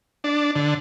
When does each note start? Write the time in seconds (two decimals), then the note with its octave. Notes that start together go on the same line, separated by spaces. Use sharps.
0.24 D4
0.55 D3